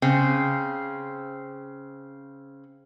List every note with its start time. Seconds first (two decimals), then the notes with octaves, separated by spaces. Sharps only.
0.02 C#3 C4